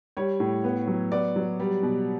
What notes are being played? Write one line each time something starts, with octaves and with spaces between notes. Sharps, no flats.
G3 C#5
A2
B3
F#3
B3 D5
F#3
G3
B2